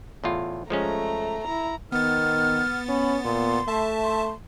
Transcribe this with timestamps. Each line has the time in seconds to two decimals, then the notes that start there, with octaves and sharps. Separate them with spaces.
0.24 E2 A2 F4
0.70 F3 G#3 A3 C#4 A#5
1.45 E4 A#5
1.92 D#3 B3 F6 A6
2.89 C#4 B5
3.25 A#2 C6
3.68 A3 E5 A5
4.04 C6